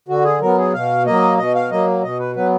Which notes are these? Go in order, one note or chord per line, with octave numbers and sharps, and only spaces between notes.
D3 F#4
G#4
F#3 B3 A#4
G#4
B2 F5
F#3 A#3 D#5
B2 D#5
F5
F#3 A#3 D#5
B2 D#5
B4
F#3 B3 B4